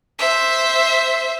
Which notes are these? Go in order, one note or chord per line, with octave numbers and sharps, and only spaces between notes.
C5 E5